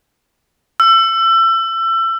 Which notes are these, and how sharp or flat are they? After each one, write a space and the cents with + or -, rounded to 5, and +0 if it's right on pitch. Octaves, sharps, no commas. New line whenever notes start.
E6 +30